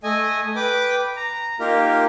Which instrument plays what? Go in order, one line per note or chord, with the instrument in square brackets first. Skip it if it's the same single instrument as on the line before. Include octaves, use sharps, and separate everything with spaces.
[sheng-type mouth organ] A3 D#5 G#5
B4 G5 D6
A#5
A#3 D#4 F4 G4 A#4